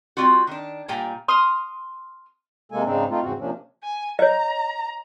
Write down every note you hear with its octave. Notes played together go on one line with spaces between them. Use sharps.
G3 C4 F4 F#4
D#3 D4
A#2 G3 G5 G#5 A#5
C6 D#6 F6
C3 G#3 A#3 A4 G#5
G#2 C#3 C4 D4 D#4
A3 C4 D#4 F4
E2 G#2 C#3 C4 F#4
C3 F3 A#3 C#4 D4
G#5
C#5 D#5 A#5